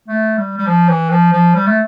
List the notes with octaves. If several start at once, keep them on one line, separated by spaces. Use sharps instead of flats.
A3
G3
G3
F3
E3
F3
F3
G3
A3